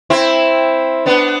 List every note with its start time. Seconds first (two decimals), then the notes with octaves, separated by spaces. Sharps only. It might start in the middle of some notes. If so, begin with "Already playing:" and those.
0.10 C4 E4
1.06 B3 D4